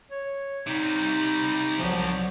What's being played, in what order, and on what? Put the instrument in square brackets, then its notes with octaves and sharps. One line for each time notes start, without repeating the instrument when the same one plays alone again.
[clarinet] C#5
[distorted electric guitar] C3 G3 [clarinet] D#4
[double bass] C2 F#3 [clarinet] F3